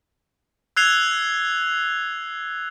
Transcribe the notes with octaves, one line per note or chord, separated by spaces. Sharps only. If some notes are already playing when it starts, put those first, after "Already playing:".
E6 F#6 G#6 C7 F7 G7